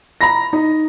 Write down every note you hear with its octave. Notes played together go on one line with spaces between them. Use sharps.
A#5 B5 A#6
D#4